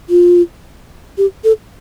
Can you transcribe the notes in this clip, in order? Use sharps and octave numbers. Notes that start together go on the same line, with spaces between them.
F4
G4
A4